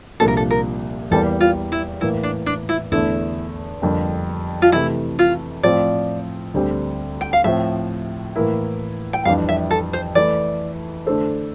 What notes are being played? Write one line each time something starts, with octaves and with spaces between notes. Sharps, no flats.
C2 A#2 F3 A#3 D4 A4
A#4
A4
A#4
E2 E3 G3 A#3 A4
F4
E4
A2 E3 A#3 E4
D4
D4
E4
E2 D3 A3 E4
F2 D3 G3 A#3
F4
C3 E3 A3 E4
F4
A2 F3 C4 F4 C5 D5
D2 D3 G3 C4 G4
G5
F5
A2 F3 C4 E5
A2 E3 A#3 E4 A#4
G5
F2 E3 G3 D4 F5
E5
A4
C5
E3 A3 E4 D5
D3 A3 D4 A4 C5